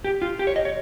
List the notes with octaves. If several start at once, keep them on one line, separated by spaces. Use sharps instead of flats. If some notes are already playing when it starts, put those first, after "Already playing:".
G4
F4
G4
C#5
D#5
C#5